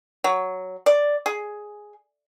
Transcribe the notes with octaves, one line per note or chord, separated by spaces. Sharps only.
F#3
D5
G#4